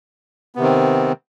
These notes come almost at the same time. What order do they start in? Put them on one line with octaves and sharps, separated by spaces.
B3 C3 D#3 C4